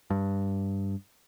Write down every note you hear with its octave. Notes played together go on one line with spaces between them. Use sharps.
G2